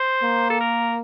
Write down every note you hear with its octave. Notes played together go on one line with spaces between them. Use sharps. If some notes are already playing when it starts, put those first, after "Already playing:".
Already playing: C5
A#3
A4
A#4